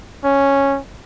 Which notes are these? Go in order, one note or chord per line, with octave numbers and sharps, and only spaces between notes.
C#4